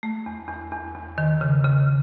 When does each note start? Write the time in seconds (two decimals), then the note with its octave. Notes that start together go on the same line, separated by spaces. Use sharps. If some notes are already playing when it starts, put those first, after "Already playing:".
0.03 A3
0.26 E2
0.49 E2
0.72 E2
0.95 E2
1.18 D#3
1.41 C#3
1.65 C#3